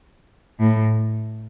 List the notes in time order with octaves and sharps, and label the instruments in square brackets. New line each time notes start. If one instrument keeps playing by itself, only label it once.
[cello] A2